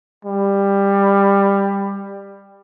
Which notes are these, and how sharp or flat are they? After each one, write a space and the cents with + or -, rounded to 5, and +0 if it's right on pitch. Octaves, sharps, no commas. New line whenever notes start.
G3 +15